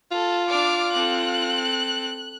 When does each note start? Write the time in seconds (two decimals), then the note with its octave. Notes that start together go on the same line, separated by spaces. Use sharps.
0.11 F4 A4
0.48 D4 D5 D6 F6
0.93 C4 A4 F#6